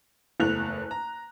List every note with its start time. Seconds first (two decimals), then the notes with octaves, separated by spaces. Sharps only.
0.40 F#1 E2 A3 F#6 F7
0.91 A#5